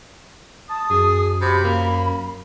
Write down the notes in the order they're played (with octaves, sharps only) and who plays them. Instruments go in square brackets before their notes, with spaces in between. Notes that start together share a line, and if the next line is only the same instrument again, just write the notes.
[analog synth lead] A5 [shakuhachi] D#6
[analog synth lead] F#2 [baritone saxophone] G#4
[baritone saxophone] C3 [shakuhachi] B5
[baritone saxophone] A#3